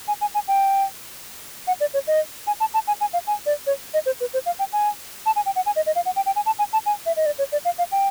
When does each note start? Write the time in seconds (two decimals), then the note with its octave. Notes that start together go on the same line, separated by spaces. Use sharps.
0.08 G#5
0.21 G#5
0.35 G#5
0.48 G5
1.67 F#5
1.81 D5
1.94 C#5
2.07 D#5
2.47 G#5
2.60 A5
2.74 A5
2.88 G#5
3.01 G#5
3.13 F5
3.27 G#5
3.46 D5
3.67 C#5
3.94 D#5
4.06 C5
4.20 B4
4.33 C5
4.46 F5
4.59 G5
4.73 G#5
5.26 A5
5.36 G#5
5.46 G5
5.56 F#5
5.66 G#5
5.76 D#5
5.86 D#5
5.96 F5
6.06 F#5
6.16 G5
6.26 G5
6.36 G#5
6.46 A5
6.59 G#5
6.73 A5
6.86 G#5
7.06 E5
7.17 D#5
7.26 D5
7.38 C#5
7.52 D5
7.65 F5
7.78 F5
7.92 G5